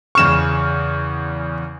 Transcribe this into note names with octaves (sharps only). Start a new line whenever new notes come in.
E2 C#3 C#6 F6 E7